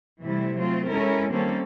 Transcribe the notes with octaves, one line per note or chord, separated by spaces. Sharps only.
C3 E3 G3 A3 E4
F#3 A3 C4 F4
G#3 C#4 E4 A4 A#4
D#3 G3 A#3 C4 C#4 A4